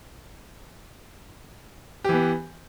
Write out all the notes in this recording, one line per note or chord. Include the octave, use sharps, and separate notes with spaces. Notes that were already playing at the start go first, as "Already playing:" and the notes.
E3 B3 G4